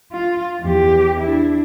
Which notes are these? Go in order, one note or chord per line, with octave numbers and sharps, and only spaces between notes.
F4
E2 G4
D4 E4